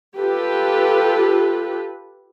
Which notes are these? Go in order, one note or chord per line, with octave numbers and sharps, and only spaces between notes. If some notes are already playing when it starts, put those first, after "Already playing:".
F4 G4 A4 B4